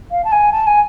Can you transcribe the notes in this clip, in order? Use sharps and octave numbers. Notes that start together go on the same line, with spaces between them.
F5
A5
G#5
A5
G#5